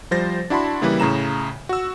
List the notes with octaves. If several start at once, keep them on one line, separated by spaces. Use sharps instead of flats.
F3 G3 C5 A6 A#6
D4 E4 F#4 A5 B5 C6
C#3 E3 G3 A#3 E4 B4
A2 C#3 A#5 E7
F#4 E6